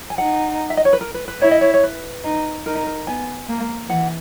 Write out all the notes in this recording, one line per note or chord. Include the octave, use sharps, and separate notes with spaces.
G#5
D#4 F#5
E5
D#5
C#5
B4
A#4
B4
B4
E4 C#5
D#5
C#5
C#5
B4
D#4
D#4 A#4
A#4
B3 G#5
A#3
E3 F#5